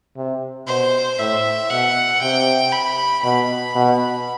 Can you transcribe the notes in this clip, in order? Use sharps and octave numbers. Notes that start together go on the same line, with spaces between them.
C3
B2 C5
A2 E5
B2 F#5
C3 G5
B5
B2 B5
B2